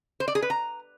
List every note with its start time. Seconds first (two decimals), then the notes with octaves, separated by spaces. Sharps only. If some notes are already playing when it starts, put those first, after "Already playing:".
0.20 C5
0.28 D5
0.35 G#4
0.43 B4
0.50 A#5